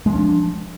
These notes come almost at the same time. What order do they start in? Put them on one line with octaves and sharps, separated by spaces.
G#3 F3 C#4 D4